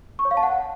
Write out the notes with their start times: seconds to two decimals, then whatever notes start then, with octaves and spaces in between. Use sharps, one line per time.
0.19 C#6
0.25 C#5
0.31 F5
0.37 A5
0.43 F#5